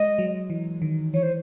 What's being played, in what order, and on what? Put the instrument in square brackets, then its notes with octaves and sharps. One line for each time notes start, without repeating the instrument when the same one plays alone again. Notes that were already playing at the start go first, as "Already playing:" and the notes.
Already playing: [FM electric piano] G#3 [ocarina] D#5
[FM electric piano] F#3
E3
D#3
[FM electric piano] E3 [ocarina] C#5
[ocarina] C5